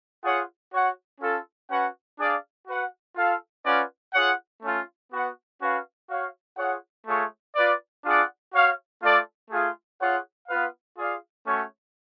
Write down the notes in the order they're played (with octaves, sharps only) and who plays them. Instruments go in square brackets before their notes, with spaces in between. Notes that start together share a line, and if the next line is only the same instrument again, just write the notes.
[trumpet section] F4 G#4 C#5 F#5
F#4 C#5 F#5
C#4 F4 A4
C#4 F#4 B4 F#5
D4 G#4 D5 F5
F#4 B4 F#5
F4 A4 F5
C#4 F4 B4 D5 F#5
F4 G#4 C#5 F#5
A3 C#4 F4
B3 F#4 B4 F#5
C#4 F#4 B4 F5
F#4 C#5 F5
F4 G#4 C#5 F#5
A3 F4 G#4 C#5
F4 B4 D5
D4 F4 G#4 D5 F#5
F#4 C#5 F5
A3 F4 A4 D5
A3 F4 G#4
F4 G#4 C#5 F#5
B3 F4 B4 F5
F4 G#4 D5 F5
A3 C#4 F#4 C#5